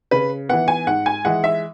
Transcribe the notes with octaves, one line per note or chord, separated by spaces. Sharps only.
C#3 B4
E3 B3 F#5
G#5
G#2 F#5
G#5
E3 G#3 F#5
E5